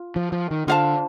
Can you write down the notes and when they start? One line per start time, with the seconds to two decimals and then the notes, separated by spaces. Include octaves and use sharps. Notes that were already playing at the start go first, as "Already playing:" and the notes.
Already playing: F4
0.16 F3
0.32 F3
0.51 D#3
0.67 D3 F4 C5 F5 A5